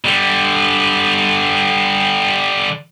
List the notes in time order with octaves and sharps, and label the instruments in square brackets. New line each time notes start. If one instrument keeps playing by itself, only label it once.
[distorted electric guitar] D3 G3